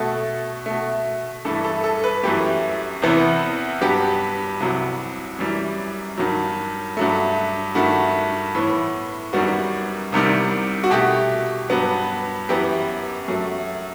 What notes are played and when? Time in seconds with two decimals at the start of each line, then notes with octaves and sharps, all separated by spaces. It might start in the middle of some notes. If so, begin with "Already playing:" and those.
Already playing: B2 A3 A4
0.66 B2 A3
1.45 G2 E3 A3 A4
1.64 A4
1.84 A4
2.04 B4
2.23 F#2 E3 A3 G4
3.02 E2 C3 E3 B3
3.81 G2 F#3 B3 G4
4.60 C2 C3 F#3
5.39 F#2 E3 G3
6.18 G2 D#3 F#3
6.97 G2 F#3 A3
7.75 G2 D#3 A3 F#4
8.55 A2 E3 B3
9.33 F#2 D#3 G3 B3 F#4
10.12 C2 C3 D#3 G3
10.84 F#4
10.91 B2 A3 G4
11.70 G2 F#3 B3
12.49 F#2 E3 B3 G4
13.28 F#2 F#3 A3